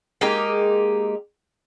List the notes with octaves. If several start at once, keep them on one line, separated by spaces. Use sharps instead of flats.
G#3 A#3 D#4 G4